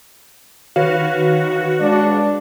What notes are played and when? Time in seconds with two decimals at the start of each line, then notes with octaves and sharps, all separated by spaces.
0.76 D#3 F#4 B4 C#5 F5
1.80 G#3 D4